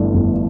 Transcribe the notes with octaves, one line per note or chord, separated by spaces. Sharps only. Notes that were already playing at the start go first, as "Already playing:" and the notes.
Already playing: G1 G2 E3 A3 D4
G1